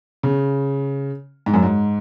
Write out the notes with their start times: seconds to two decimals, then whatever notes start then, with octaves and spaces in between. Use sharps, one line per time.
0.23 C#3
1.46 G#2
1.54 F#2
1.63 G#2